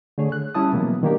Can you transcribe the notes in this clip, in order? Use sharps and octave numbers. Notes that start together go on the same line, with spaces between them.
D3 A3 G#4 C#5
F#6
G3 C#4 E4 A5 D#6
B2 E3 F#3 G#3 A#3 B3
D#3 F#3 A#3 D4 G4 A#4